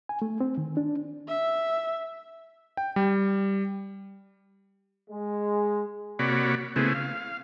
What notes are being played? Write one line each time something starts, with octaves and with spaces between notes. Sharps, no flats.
G#5
A3
C4
D#3
D4
E5
G5
G3
G#3
C3 A#3 F#4 C#5 D5 B5
C#3 A3 B3 C4 E4 G#4
F5